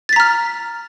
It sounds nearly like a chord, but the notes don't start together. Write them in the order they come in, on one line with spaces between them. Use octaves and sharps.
A6 B6 A#5 F6